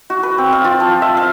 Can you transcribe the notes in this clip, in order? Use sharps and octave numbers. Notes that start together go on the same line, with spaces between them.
F#4
B4
C4
F5
F4
F3
E5
F5